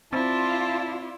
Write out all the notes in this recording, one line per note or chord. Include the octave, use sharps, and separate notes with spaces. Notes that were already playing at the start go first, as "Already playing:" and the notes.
C4 E4 F4 D5 A5